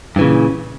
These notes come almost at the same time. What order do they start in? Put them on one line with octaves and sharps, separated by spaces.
G2 E3 C#3 A#2